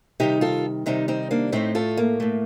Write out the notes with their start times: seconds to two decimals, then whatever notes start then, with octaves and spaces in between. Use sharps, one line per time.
0.20 C3 D#3 G3 D#4 G4
0.41 F4 A4
0.86 C3 D#3 G3 C4 D#4
1.08 C4 D#4
1.31 A#3 D4
1.52 A2 A3 C4 D#4
1.75 F4 A4
1.97 A#3
2.20 A2 A3